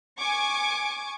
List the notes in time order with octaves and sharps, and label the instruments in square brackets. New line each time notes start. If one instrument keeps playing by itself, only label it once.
[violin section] G#5 C#6 D6